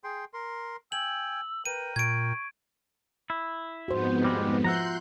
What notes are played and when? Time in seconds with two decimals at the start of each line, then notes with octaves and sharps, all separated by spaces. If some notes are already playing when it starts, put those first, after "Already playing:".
0.04 G#4 G5 C6
0.34 A#4 C6
0.92 G5 G#5 E6 F#7
1.65 A#4 B4 G5 D#7
1.96 A#2 C#6 G#6 D7
3.30 E4
3.88 F2 G#2 B3 F#4 C5
4.23 D#2 G3 G#3
4.64 F3 E5 F#5 A#5 C6 F#6 G6